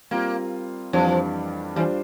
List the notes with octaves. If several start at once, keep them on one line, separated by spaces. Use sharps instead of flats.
G3 A#3 C4 F4
F2 E3 F3 G3 D4
E3 G3 D4 F4 C5